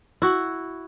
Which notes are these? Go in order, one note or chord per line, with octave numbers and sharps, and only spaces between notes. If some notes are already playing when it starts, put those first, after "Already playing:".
E4 F#4